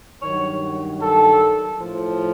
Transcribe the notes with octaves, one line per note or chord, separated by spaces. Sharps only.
G2 D#3 F#3 C#5
A4
A2 F3